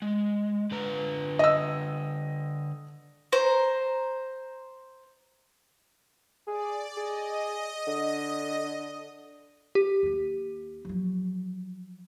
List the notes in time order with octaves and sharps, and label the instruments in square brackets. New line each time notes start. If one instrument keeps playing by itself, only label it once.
[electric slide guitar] G#3
D3 B4 A#5
[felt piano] D#5 E6
[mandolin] C5 A#5
[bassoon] G#4 [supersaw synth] D5
[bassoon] G#4 [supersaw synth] D#5
[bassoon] D3
[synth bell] G4
[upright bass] D#2 A#3
F3 F#3